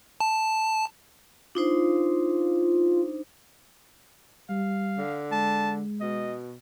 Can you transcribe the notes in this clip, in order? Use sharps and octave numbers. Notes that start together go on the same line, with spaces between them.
A5
D4 D#4 F4 C5
G3 F5
D3
G#3 A5
B2 D#5